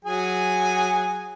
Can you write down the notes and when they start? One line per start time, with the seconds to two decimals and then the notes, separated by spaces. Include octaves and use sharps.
0.05 F#3 G#4 G#5